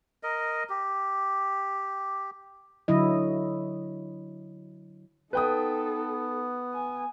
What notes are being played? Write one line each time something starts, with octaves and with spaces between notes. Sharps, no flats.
A#4 D#5
G4
D3 F#3 E4 D#5
B3 D#4 A4 B4 G5 D#6
G#5